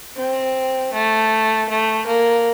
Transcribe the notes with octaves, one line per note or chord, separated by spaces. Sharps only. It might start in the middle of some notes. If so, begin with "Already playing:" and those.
C4
A3
A3
A#3